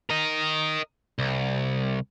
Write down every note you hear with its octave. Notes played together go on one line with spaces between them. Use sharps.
A#4 D#5
C2